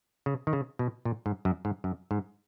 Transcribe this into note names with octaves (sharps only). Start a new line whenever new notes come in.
C#3
D#3
C#3
B2
A#2
G#2
F#2
G#2
F#2
G#2